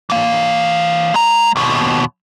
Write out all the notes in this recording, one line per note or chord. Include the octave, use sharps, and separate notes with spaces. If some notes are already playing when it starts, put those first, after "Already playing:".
E3 F5
G#3 A#5
D#2 B2